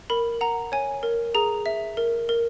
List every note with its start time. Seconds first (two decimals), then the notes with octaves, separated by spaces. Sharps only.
0.10 A#4 B5
0.41 F#5 A#5
0.72 C#5 G#5
1.03 A#4
1.35 G#4 A#5
1.66 E5
1.97 A#4
2.29 A#4